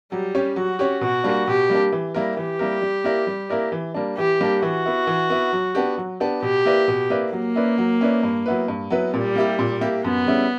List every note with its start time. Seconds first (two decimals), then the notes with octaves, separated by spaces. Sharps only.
0.12 F#3 G3
0.35 C#4 G4 C#5
0.56 F#3 F#4
0.79 C#4 G4 C#5
1.01 B2 F#4
1.24 G3 A#3 D4
1.47 B2 G4
1.70 G3 A#3 D4
1.92 E3
2.14 G3 A#3 E4 A#4
2.37 E3 G4
2.59 G3 A#3 E4 A#4
2.82 G3
3.04 A#3 E4 A#4 D5
3.27 G3
3.50 A#3 E4 A#4 D5
3.72 E3
3.94 G3 A#3 D4
4.17 E3 G4
4.41 G3 A#3 D4
4.62 E3 F#4
4.86 B3 E4
5.07 E3
5.30 B3 E4
5.53 F#3
5.75 B3 D4 G4
5.98 F#3
6.20 B3 D4 G4
6.42 B2 G4
6.66 A#3 E4 B4 D5
6.88 B2
7.10 A#3 E4 B4 D5
7.33 F#3 A#3
7.56 C#4 E4 B4 D5
7.78 F#3
8.01 C#4 E4 B4 D5
8.23 G2
8.46 F#3 B3 E4 B4
8.68 G2
8.90 F#3 B3 E4 B4
9.14 A#2 G3
9.36 A#3 E4 G4
9.59 A#2
9.81 A#3 E4 G4
10.04 F#2 B3
10.26 C#3 G3 C#4 E4